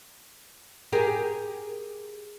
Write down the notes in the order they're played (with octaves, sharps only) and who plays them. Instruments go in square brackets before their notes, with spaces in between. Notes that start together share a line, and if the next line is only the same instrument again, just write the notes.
[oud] G4 G#4 A#4